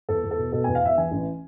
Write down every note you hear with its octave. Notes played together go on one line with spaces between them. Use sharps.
E2 A4
E2
A4
B2
B2 A4
E2 G#5
F5
E2 E5
E3 G#5
A1